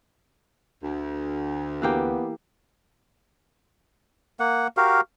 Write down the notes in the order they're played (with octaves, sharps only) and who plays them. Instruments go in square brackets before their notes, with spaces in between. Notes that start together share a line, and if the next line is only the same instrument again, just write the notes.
[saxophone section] D2
[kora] E3 A#3 G4 [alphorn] B3
[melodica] A#3 F#5
F#4 G4 A#4 F5